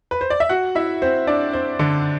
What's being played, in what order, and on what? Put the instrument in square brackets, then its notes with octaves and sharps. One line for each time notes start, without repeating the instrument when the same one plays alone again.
[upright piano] B4
C5
D5
E5
F#4 F#5
E4 E5
C4 C5
D4 D5
C4 C5
D3 D4